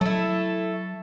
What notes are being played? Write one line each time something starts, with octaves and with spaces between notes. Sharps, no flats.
F#3 A3 E4 A4